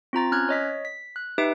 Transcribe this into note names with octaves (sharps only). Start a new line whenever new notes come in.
C4 F4 A#5 A6
C#4 F6 F#6 G#6
C#5 D#5 B6
B6
F#6
D#4 G4 B4 E5 D7